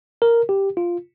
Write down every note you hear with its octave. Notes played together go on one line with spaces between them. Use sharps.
A#4
G4
F4